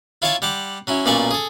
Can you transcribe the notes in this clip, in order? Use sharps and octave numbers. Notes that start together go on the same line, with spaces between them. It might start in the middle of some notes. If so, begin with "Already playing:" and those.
E4 F4 C#5 E5 A5 C#6
G3 F#5 C6 D6
F#3 C#4 E4
B1 A#2 C#4 D5 B5 C#6
G#4 A4